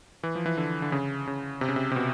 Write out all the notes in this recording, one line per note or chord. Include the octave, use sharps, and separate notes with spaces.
E3
F3
E3
D3
D3
C#3
C#3
C3
C#3
C3
C3
B2